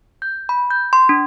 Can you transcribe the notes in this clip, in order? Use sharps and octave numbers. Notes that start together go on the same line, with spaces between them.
G6
B5
G6
C6
D4